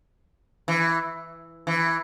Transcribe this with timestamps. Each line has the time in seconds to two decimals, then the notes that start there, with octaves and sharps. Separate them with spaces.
0.68 E3
1.67 E3